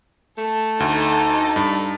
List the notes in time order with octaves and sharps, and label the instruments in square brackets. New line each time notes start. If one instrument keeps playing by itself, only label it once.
[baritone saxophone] A3 [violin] A4
[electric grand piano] D2 [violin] D#4 A4
[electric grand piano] G2